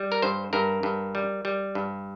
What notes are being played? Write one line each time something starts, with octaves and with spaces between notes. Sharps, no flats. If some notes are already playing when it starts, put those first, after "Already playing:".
Already playing: G3
A#4
G2 C5
G2 A#4
G2
G3
G3
G2